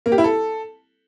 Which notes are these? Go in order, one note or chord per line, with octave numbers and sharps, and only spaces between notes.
A#3
G4
E4
A4